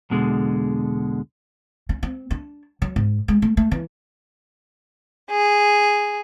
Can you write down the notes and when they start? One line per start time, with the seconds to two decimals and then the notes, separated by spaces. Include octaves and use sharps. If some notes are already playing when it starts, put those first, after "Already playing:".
0.10 B1 E2 B2 D3 G#3
1.89 C#4
2.03 C4
2.31 D4
2.82 F#3
2.96 G#2
3.28 G#3
3.42 A3
3.57 A3
3.71 E3
5.31 G#4